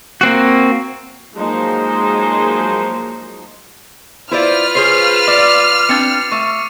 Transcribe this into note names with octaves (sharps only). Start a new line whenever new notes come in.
A#3 C4 F#4
F3 F#3 G#3 A#3 D#4 C5
E4 F4 B4 C5 D5 F6
G#4 C5 C#5 C7
D5 D6
C4 D4 A6 C#7
A3 C#6